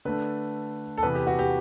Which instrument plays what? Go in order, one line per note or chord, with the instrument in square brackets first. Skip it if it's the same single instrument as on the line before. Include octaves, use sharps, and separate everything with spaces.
[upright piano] D3 A3 D4 B4
A4
E2 C3 E3 B4
G4
F#4
G4